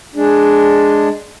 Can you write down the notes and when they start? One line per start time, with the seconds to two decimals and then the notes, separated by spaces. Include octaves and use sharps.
0.15 G#3 D4